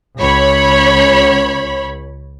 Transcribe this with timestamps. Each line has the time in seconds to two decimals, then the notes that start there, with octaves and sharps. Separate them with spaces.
0.18 C#2 C#5 B5